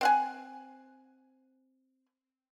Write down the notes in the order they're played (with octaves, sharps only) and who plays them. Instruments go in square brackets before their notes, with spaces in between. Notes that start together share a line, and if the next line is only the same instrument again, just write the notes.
[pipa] C4 F#5 G#5